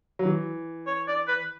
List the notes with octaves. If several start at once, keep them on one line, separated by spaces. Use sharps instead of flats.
F#3
E3
C#5
D5
B4